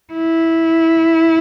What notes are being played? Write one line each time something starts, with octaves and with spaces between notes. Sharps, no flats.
E4